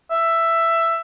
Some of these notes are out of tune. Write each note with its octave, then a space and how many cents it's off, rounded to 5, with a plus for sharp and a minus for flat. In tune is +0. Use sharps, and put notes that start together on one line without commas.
E5 +10